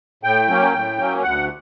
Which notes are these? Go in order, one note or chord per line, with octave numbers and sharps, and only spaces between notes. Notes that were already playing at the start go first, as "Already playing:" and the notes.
A2 G5
F#3 A#3 C#4
A2
F#3 A#3 C#4
D2 F#5